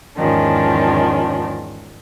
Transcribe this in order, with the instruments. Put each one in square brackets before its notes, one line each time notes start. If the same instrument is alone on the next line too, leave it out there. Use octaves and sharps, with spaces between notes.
[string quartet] E2 G#2 D#3 F3 C#4 D4